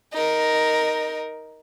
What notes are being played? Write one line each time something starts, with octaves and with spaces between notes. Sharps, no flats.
D#4 A#4